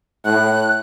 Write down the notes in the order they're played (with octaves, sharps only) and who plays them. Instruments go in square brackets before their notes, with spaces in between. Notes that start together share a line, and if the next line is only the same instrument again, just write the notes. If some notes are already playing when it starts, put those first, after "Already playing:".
[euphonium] A2 [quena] F#6